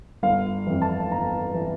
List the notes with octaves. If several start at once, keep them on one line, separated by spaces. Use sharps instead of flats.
G1 F5
F2 E3
A5
G1 A#5
E3